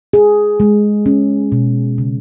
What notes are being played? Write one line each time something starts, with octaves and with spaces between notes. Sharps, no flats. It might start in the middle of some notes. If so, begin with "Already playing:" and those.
G#4
G#3
C#4
B2
C#3